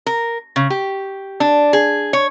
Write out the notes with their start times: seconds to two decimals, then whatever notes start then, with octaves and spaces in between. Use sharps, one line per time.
0.06 A#4
0.56 C#3
0.70 G4
1.40 D4
1.73 G#4
2.13 C#5